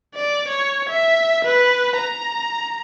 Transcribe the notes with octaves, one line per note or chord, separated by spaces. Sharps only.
D5
C#5
E5
B4
A#5